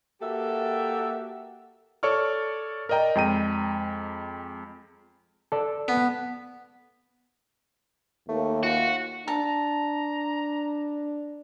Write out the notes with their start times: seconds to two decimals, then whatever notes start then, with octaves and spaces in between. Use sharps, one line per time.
0.21 A#3 F#4 G4 A4 E5
2.03 A4 C#5 D5 C#6 F6
2.89 A#4 D5 D#5 G5 A#5
3.15 F2 G#3 G5 A#5 D#7
5.52 A4 D5
5.88 B3
8.29 D#2 A3
8.63 F4 F#4
9.28 D4 A5 A#5